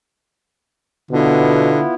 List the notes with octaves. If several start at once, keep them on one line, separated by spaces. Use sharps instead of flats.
B2 D3 B3 E4 F4